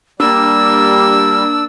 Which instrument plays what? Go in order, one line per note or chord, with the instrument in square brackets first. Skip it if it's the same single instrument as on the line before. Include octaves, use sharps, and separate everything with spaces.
[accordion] G3 [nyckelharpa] A#3 [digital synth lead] D4 [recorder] E6